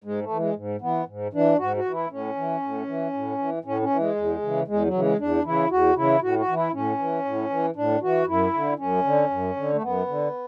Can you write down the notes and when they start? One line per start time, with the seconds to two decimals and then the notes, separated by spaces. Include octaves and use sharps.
0.04 G#2 G#3
0.22 A3
0.30 E3
0.39 G#3
0.56 G#2
0.81 E3 B3
1.07 G#2
1.33 E3 D4
1.58 G#2 F#4
1.77 F#4
1.85 E3
1.93 E4
2.10 A2 C#4
2.36 E3
2.62 A2
2.87 E3
3.13 A2
3.38 E3
3.64 A2 C#4
3.82 C#4
3.90 E3
3.98 G#3
4.16 E2
4.42 C#3 E3
4.67 E2 G#3
4.85 F#3
4.94 C#3 E3
5.01 G#3
5.19 E2 D4
5.44 C#3 E3 E4
5.71 E2 F#4
5.96 C#3 E3 E4
6.22 A2 F#4
6.39 F#4
6.48 E3
6.56 E4
6.73 A2 C#4
6.98 E3
7.25 A2
7.50 E3
7.76 A2 D4
8.02 E3 F#4
8.27 F#2 E4
8.54 D3
8.79 F#2 C#4
9.04 D3
9.30 F#2
9.56 D3
9.73 A3
9.82 F#2 B3
10.08 D3